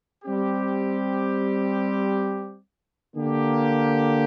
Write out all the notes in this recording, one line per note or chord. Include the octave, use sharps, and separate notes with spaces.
G3 C4 G4
D3 A#3 G4